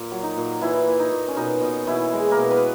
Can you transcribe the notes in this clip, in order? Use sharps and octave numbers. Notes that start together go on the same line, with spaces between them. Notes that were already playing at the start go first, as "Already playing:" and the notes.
Already playing: A#2
F#3
D#4
A#2
A#2 E3 E4
A#2
D#4
A#2
C#4
B2 D#4
B2
B2 E3 E4
G#3
A#3 A#4
B2
B3 B4